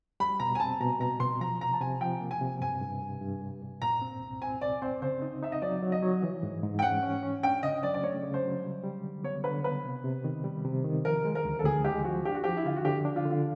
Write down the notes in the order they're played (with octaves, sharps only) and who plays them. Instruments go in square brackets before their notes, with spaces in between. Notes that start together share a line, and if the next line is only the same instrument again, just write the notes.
[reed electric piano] G3 [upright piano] B5
[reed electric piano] B2 [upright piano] A#5
[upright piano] G#5
[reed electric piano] C4 [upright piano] A5
[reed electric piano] B2 [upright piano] A#5
[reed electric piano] B2 [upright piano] A#5
[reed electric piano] B2 [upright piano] C6
[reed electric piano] F3 [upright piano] A#5
[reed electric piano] C3 [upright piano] A#5
[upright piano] A5
[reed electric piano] C3 [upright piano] G#5
[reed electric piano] F3 [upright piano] G5
[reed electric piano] A#3
[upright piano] G#5
[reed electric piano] C3
[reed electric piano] G2 [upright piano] G#5
[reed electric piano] G2
G2
G2
G2
G2
[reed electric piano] A#2 [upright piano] A#5
[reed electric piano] C4
C2
[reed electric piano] C4 [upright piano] G#5
[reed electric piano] C2 [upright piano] D5
[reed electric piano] C4 [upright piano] C5
[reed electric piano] C#3 [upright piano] C5
[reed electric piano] D#4
[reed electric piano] D#4 [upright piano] E5
[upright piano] D#5
[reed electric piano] F#3 [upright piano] D5
[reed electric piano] F#3
[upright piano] D#5
[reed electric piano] F#3
E3
G#2
G#2
[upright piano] G5
[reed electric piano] C#4 [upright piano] F#5
[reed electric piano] C#4
C#4
[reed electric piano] D4 [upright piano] G5
[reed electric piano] C#3 [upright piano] D#5
[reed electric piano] F#3 [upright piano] D5
[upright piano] D5
[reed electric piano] A3 [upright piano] C#5
[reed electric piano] C#3
[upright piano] C5
[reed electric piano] F#3
G3
G3
D3
[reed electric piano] B3 [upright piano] C#5
[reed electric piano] D3 [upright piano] B4
[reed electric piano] B3 [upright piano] B4
[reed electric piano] C3
C3
D#3
G3
C3
D#3
[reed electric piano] F3 [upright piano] A#4
[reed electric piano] G#3
[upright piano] A#4
[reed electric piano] D2
[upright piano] A4
[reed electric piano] D2 [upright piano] G#4
[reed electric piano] G#3 [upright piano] G4
[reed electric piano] F3 [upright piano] F#4
[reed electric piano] D4 [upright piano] G4
[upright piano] F#4
[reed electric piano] F3 [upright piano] G4
[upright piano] E4
[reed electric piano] D3 [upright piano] F4
[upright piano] F#4
[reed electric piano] D3 [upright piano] G4
[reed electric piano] D4
[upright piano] F4
[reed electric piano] D3
[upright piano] F4